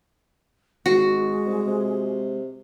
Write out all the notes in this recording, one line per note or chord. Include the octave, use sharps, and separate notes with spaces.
G#1 G#3 F#4
C2
C3